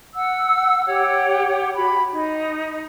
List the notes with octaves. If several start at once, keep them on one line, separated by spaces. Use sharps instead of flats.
F#5 E6
G4 C#5 F#5
F#4 B5
D#4